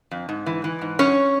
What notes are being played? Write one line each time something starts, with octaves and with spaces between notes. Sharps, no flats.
F2
G#2
E3
E3
G#2
F#2 C#4 C#5